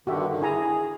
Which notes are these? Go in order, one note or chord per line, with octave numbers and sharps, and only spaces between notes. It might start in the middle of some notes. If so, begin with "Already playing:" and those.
G2 D3 D#3 F#4 G4 E5
D3 D#3
E4 G#4 G#5 A#5